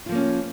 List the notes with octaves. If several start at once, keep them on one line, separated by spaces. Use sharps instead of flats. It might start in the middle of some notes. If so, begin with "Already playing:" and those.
F3 A#3 C#4 F4